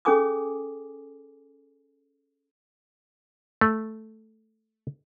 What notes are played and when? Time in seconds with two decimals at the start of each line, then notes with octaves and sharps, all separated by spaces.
0.05 C#4 G#4 A4 G#5 D6 D#6
3.61 A3